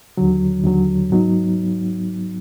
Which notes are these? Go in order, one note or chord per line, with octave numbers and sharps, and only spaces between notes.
D#2 D3 F#3
D#2 D3 F#3
G#2 F#3 B3 D#4